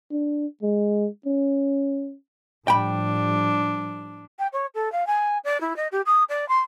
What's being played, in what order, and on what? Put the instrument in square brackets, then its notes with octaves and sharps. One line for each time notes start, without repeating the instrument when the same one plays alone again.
[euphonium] D4
G#3
C#4
[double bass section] A2 F3 G3 [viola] D4 [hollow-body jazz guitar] G5 B5
[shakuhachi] G5
C#5
A4
F5
G#5
D5
E4
D#5
G4
D#6
D5
C6